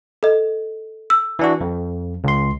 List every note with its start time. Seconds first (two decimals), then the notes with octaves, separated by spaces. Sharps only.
0.23 A4 D#5
1.10 E6
1.39 E3 D4 F#4
1.61 F2
2.24 C#2 C6